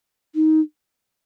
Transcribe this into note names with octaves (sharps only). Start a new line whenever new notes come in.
D#4